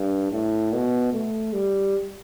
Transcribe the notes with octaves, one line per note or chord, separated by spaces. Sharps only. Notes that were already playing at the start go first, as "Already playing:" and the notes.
Already playing: G2
A2
B2
A3
G3